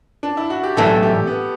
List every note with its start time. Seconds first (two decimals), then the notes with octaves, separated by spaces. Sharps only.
0.23 D4
0.37 E4
0.50 F#4
0.63 G4
0.77 B1 A2 E3 A3 D4 A4
1.03 G4
1.27 B3